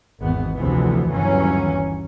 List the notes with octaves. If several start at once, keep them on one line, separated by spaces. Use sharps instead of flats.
G#1 E2 B3
D2 C3 E3 F3 B3
G1 D#2 E3 F#3 C#4